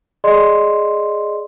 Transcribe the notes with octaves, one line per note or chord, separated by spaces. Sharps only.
G#4 D5 D#5 C6